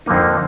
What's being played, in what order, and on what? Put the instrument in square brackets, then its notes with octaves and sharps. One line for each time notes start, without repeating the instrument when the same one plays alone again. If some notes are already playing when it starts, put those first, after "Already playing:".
[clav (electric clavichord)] F2 D3 F3 A#3 D#4